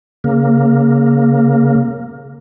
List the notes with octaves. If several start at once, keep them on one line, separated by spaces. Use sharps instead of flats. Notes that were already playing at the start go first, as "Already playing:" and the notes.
C#3 A#3